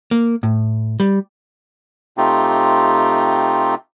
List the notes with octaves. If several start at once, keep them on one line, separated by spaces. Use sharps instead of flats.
A#3
A2
G3
C3 A3 C4 D#4 F4 G4